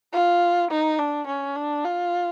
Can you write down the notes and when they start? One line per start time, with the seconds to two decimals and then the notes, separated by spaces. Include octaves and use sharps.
0.13 F4
0.70 D#4
0.99 D4
1.27 C#4
1.56 D4
1.84 F4